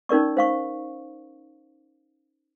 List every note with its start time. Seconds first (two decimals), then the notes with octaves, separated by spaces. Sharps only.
0.09 C#4 D#4 A#4 D5 C#6
0.37 C5 F5 C#6